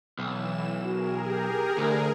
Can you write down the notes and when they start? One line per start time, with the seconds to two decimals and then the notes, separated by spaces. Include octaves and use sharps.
0.19 B1 E3 E7
0.83 F#4 G#4 A#4
1.26 G4
1.78 D2